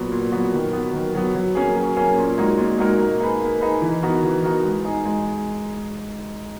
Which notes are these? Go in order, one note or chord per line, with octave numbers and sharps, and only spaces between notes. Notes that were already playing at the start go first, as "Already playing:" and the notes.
Already playing: A#2 F#3 B3 F#4
A#2
F#3 B3 F#4
D#3
F#3 B3
D#3
F#3 B3
F#3
A#3 C#4 G#4
F#3
A#3 C#4 G#4
A#2
G#3 D#4 F#4 A#4
A#2
G#3 D#4 F#4 A#4
A#3
D#4 G#4 B4
A#3
D#4 G#4 B4
E3
B3 D#4 F#4 A#4
E3
B3 D#4 F#4 A#4
G#3
D#4 G#4
G#3